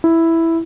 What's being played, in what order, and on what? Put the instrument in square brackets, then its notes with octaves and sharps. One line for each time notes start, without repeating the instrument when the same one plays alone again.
[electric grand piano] E4